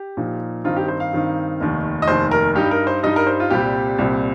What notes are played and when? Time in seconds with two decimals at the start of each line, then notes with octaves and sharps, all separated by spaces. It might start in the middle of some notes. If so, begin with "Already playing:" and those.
Already playing: G4
0.17 A#2 F3 D#4
0.64 G2 D#3 C4 D#4 F4
0.76 G4
0.88 C5
1.00 F5
1.12 G2 D#3 C4 D#4
1.60 F1 D#2 D#3
2.02 D#5
2.08 F1 D#2 D#3 C5
2.31 A#4
2.55 G2 G3 D#4 G4
2.71 A#4
2.87 C5
3.03 G2 G3 D#4 D#5
3.16 A#4
3.27 C5
3.40 F4
3.50 C2 A#2 G3 C4 G4
3.98 C2 A#2 G3 C4